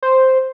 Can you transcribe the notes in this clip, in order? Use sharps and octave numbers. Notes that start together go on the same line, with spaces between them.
C5